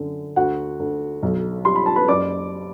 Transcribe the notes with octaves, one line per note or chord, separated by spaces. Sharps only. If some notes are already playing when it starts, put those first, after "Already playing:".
Already playing: F#2 D3
D2 F#4 F#5
D2
B1
G3 C6
B5
A5
B4 B5
F#1 D5 D6